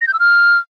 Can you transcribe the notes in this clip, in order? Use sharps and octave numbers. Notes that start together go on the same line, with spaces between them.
A#6
G6
E6
F6